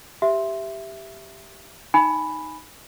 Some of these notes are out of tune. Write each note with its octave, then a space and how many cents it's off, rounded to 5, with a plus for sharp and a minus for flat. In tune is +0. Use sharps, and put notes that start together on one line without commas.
G4 +0 E5 +10
D#4 +0 G#5 +0 B5 +0